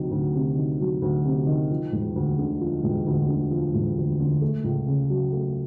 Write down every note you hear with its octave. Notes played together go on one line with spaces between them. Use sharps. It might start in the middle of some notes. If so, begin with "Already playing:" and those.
Already playing: D2 C3 D#3 F#3
D2
C3
D#3
F#3
D2
C3
D#3
F3
E1
D2
D3
F3
E1
D2
D3
F3
E1
D2
D3
A3
C#2
C#3
F#3
A3